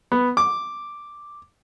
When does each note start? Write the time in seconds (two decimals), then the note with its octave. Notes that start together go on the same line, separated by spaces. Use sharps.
0.12 B3
0.37 D6